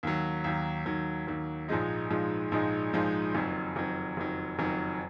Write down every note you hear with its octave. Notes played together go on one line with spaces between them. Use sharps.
D#2 D#3 F#3
D#2 D#3 F#3
D#2 D#3 F#3
D#2 D#3 F#3
A#1 G#2 F3 G#3 D#4
A#1 G#2 F3 G#3 D#4
A#1 G#2 F3 G#3 D#4
A#1 G#2 F3 G#3 D#4
F#1 F2 D#3 F#3
F#1 F2 D#3 F#3
F#1 F2 D#3 F#3
F#1 F2 D#3 F#3